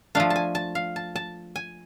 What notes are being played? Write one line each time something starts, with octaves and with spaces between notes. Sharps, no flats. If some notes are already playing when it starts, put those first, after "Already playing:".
F3 A3 D4 F5
A5
G#5
A5
F5
A5
A5
G#5